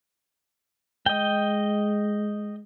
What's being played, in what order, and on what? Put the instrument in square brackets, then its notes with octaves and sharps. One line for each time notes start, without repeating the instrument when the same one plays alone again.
[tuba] G#3 [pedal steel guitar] D#5 G5